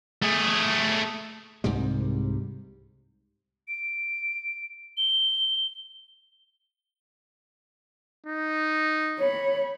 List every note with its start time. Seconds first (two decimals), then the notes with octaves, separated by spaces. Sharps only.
0.22 A3 G#4
1.64 C2 G#2 C3 G3
3.68 D7
4.97 G7
8.27 D#4
9.19 C#5 B5